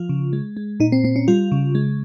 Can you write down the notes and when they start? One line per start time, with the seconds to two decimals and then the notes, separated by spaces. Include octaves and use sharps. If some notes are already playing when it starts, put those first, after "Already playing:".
Already playing: F3 F4
0.09 C#3
0.33 G#3
0.57 G#3
0.80 A#2 D#4
0.92 C4
1.04 A#2 C4
1.16 C#4
1.28 G3 F4
1.52 C#3
1.75 G#3